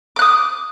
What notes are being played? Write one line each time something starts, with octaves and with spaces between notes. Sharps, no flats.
D6 D#6 F#6